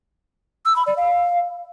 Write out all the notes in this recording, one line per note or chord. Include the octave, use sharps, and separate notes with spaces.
E6
B5
D5
F5